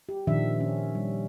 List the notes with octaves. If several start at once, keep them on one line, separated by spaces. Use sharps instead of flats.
G4
A#2 D#3 F3 D4 G4 E5
C#4
G3